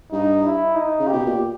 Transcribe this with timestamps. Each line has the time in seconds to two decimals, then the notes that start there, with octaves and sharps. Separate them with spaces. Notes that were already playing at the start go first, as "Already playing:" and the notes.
0.12 G2 D#4
0.44 E4
0.75 D#4
1.00 C#3
1.08 G4
1.13 B2
1.26 A#2